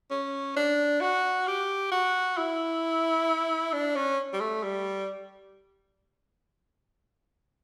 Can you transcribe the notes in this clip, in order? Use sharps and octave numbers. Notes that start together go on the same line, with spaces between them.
C#4
D4
F#4
G4
F#4
E4
D4
C#4
G3
A3
G3